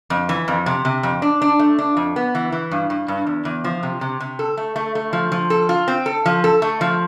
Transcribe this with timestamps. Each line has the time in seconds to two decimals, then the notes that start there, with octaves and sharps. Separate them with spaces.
0.10 F2
0.29 E3
0.48 F2
0.66 C3
0.85 C3
1.03 F2
1.22 D4
1.42 D4
1.59 A3
1.79 D4
1.97 F2
2.16 B3
2.35 E3
2.52 E3
2.71 G2
2.90 G2
3.08 G2
3.27 E2
3.45 E2
3.64 F3
3.83 C3
4.01 C3
4.20 C3
4.39 A4
4.57 A3
4.76 A3
4.95 A3
5.13 F3
5.32 F3
5.50 A4
5.69 F4
5.88 C4
6.06 A4
6.26 F3
6.44 A4
6.62 A3
6.81 F3